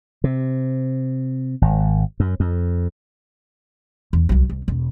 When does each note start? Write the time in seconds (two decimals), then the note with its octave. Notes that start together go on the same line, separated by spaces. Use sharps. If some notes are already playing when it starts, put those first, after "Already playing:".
0.24 C3
1.62 G#1
2.20 F#2
2.40 F2
4.13 E2
4.29 C2 F#3
4.50 C2
4.68 E1